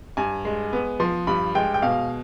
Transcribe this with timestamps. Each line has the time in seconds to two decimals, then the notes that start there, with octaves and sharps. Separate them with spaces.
0.17 G2 G#5
0.45 G#3
0.73 B3
1.00 F3 C6
1.27 G2 B5
1.55 G#3 G5
1.74 G5
1.82 B2 F5